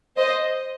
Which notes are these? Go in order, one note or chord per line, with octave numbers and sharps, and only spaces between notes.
C5 D#5